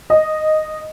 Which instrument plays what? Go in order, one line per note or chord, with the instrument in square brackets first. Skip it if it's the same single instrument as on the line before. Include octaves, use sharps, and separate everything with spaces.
[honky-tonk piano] D#5